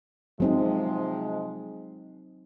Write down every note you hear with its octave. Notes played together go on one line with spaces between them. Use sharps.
C3 F3 F#3 G#3 C4 D#4